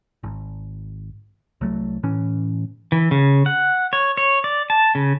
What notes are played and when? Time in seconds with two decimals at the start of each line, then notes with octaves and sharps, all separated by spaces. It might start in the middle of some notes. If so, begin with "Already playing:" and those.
0.23 G#1
1.61 C2 F#3 A3
2.03 A2 E3 C#4
2.92 E3
3.11 C#3
3.46 F#5
3.93 C#5
4.17 C#5
4.44 D5
4.70 A5
4.95 C#3